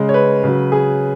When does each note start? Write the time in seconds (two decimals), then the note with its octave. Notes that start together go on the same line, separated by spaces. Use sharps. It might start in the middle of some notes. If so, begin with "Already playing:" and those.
Already playing: C#3 G#3
0.09 C#5
0.14 B4
0.44 C#3 F#3
0.72 G#4